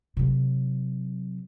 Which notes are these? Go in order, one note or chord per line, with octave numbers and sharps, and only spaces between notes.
C3 F#3